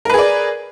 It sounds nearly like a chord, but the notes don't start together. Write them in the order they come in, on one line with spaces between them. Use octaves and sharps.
A#4 B4 G#4 D5